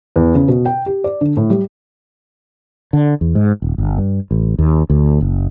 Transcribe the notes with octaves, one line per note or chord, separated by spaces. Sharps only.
E2
C#3
B2
G5
G4
D5
D3
A2
G3
D3
E2
G#2
D#1
G1
G2
A1
D#2
D2
F#1